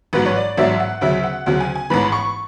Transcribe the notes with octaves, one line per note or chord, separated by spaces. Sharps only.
A1 G#2 F#3 B4
C#5
D5
A1 G#2 F#3 E5
F#5
D2 C#3 F#3 E5
F#5
D2 C#3 F#3 F#5
G#5
G#5
A1 G#2 E3 B5
C#6